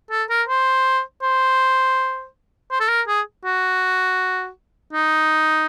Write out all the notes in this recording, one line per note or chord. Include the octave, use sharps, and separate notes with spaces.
A4
A#4
C5
C5
C5
A4
A#4
G#4
F#4
D#4